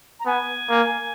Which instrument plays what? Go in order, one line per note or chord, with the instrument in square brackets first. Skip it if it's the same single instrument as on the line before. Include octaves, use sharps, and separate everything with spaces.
[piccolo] A#5
[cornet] B3 [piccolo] G#5
[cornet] A#3